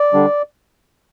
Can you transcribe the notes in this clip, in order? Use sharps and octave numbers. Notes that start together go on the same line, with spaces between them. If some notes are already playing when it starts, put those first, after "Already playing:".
Already playing: D5
D3 G3 D4